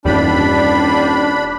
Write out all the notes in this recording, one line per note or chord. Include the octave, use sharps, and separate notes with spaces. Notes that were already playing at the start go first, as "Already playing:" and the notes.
D#1 E2 G2 G3 D4 B5